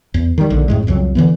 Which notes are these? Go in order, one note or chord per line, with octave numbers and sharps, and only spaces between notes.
E2
D#3 G3
A#1 D3 D#3
F2 A2 G#3
C2 F2 C#3 F#3
D3 E3 B3